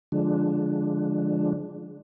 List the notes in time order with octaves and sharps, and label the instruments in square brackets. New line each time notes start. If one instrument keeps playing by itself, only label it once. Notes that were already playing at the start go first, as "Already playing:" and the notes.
[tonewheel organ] D3 F3 G#3 D4